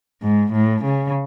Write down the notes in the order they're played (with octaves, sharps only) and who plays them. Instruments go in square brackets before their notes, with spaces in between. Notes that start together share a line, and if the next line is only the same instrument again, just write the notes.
[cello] G#2
A2
C#3